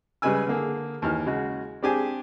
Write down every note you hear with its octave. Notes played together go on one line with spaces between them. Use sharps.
C#3 G3 G#3 B4 G#5 E6
D3 A#3 G#4
D#2 E3 F6
C#3 G#3 F#4
C4 D4 G4 G#4 G#5